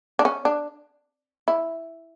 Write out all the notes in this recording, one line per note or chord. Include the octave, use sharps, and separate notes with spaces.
D4
C#4
D4
E4